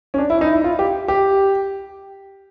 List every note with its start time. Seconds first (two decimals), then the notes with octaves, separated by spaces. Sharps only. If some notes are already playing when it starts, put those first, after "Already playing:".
0.14 C#4
0.18 D4
0.30 E4
0.41 D#4
0.53 E4
0.64 F4
0.79 G4
1.08 G4